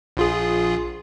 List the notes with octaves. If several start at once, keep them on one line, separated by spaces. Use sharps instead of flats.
A#1 F4 G#4